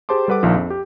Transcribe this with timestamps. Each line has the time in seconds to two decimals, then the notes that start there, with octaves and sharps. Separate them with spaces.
0.09 G4 G#4 C5 A5 C6 D6
0.28 G3 A4 B4 F#5 D6
0.43 A#1 D#3 F3
0.55 F2
0.70 G4